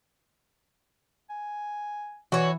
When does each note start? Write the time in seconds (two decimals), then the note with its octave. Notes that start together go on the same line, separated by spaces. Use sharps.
1.29 G#5
2.32 E3 F#4 C#5